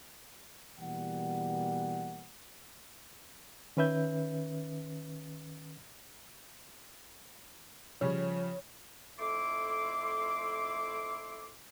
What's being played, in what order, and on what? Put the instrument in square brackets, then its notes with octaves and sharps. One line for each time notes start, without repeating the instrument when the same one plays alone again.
[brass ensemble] B2 E3 G3 A#3 F#5
[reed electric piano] D#3 C#4 B4 E5 G6
[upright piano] C#3 G3 C#4 [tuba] F3 [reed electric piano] C#5
[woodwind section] F2 A3 E4 C6 D6